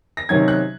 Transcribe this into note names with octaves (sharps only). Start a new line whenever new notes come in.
A#6
C3 D#3 F#3 C#4 G#6
F#6